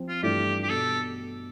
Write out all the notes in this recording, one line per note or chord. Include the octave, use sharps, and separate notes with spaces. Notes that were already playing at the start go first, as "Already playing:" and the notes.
Already playing: F3 C4
F4
G2 E3 A3 D4 F4 G4
G4
B2 A4